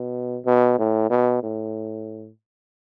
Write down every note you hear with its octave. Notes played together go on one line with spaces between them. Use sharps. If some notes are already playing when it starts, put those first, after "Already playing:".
Already playing: B2
B2
A2
B2
A2